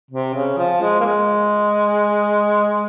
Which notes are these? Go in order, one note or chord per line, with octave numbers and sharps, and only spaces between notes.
C3
C#3
F3
G#3
A#3
G#3